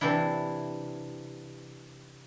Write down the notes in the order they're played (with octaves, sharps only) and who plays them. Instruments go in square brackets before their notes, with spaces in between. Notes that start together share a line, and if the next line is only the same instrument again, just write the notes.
[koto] C3 E3 D4 E4